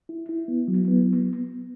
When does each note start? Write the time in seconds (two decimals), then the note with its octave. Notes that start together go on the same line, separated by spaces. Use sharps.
0.09 E4
0.29 E4
0.48 B3
0.68 F#3
0.88 B3